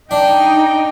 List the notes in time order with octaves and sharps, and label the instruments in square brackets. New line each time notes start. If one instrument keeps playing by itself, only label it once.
[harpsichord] D4 [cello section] D#4 [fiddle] G5